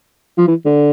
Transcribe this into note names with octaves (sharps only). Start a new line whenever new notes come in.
F3
E3
D3